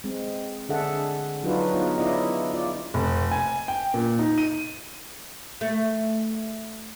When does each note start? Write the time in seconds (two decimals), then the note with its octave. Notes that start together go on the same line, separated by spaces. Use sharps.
0.04 G#3 C4
0.69 D3 D4 G#4 A4 E5 F#5
1.43 F#3 D4 D#4 F4 F#4 B4
1.74 B3 D#4 F4 G#4
1.98 C#4 E4 F4 D5 D#5
2.53 F4 D5
2.94 F1
3.32 G#5
3.68 G5
3.94 A#2
4.19 D#4
4.38 D#7
5.61 A3